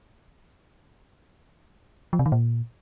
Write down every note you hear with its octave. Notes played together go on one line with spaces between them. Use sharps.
F3
C3
D#3
A#2